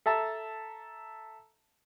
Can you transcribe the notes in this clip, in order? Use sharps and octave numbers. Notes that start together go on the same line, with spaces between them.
A4 E5 A5 A#5